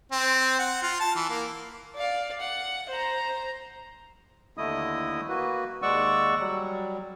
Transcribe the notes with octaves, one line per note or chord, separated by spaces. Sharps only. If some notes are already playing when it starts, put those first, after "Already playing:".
C4
F#5
F4
A5
E3
A#3
D5 F5
F#5
C5 A#5
D#2 D3 A3 E4 D#5 D#6
A#3 F#4 B4
D#2 G#3 D5 F#5 C#6 E6
F#3 G3